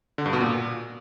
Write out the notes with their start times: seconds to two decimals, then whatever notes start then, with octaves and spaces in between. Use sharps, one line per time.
0.18 D3
0.26 G2
0.33 B2
0.40 A#2